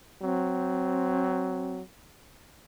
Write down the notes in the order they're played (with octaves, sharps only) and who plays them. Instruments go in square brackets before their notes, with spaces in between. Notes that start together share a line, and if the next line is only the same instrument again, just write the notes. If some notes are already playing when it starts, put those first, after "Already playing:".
[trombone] F#3 [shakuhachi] C4